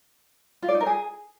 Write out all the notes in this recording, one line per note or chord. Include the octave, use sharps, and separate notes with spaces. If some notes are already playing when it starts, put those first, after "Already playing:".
F4
D5
D#4
A#4
G#4